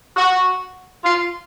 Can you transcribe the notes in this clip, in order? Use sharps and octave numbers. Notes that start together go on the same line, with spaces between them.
F#4
F4